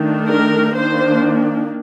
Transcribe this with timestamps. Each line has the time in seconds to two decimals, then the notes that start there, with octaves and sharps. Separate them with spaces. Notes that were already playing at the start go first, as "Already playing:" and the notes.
Already playing: D#3 A3 D4
0.28 A#4
0.75 D#3 A#3 D4 C5